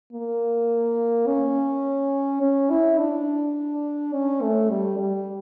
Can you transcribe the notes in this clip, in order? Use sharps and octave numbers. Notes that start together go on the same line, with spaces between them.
A#3
C#4
C#4
E4
D4
C#4
A3
G3
G3